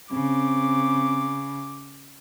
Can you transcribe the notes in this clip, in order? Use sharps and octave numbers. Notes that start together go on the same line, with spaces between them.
C#3 C4 D6